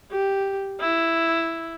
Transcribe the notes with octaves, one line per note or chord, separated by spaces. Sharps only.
G4
E4